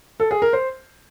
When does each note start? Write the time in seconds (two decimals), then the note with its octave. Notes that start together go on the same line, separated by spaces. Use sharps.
0.20 A4
0.31 G#4
0.42 A#4
0.53 C5